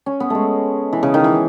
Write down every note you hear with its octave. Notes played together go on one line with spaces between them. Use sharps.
C#4
B3
G#3 A3
E3
C#3
D#3
E3